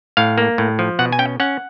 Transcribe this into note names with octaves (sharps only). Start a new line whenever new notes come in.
A2 F5
A#3
A2
F3
B2 F#5
G#5
C#4 G5
C#4 F#5